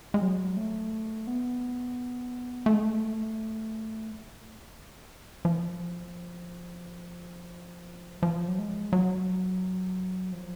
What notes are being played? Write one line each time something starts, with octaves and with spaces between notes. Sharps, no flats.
G#3
F#3
A3
B3
A3
G#3
A3
F3
F3
F#3
G#3
F#3
F3